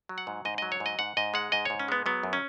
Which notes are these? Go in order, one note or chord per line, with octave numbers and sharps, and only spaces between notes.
F#3
F#5
G#2
G#2 D#5
F#3 D#5
C#5
G#2
D#5
G#2 F#5
G#2 D#5
G#3 F#5
G#2 D#5
G#2 C#5
C#4
G#3 B3
F#3 B3
F#2
C#4